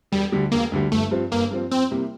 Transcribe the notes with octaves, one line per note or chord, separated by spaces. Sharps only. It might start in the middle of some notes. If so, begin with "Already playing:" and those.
E1 G3
D2 D3 G3
E1 A#3
D2 D3 G3
G1 A3
G2 F3 C4
G1 A#3
G2 F3 C4
F2 C4
C3 G3 A#3 E4